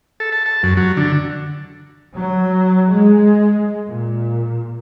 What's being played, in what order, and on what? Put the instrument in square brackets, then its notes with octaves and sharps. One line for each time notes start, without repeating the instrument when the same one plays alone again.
[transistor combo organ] A4
A5
A5
F#2
F#3
D3
[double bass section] F#3
G#3
A#2